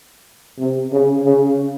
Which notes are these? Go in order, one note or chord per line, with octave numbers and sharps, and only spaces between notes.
C3
C#3
C#3